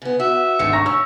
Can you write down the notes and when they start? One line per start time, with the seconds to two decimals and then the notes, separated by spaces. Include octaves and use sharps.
0.02 C#3 B3
0.20 F#4 E5
0.59 G#1 D3 G#3 A3 C#7
0.73 A#5 C#6 A#6
0.86 C#4 C#6 E6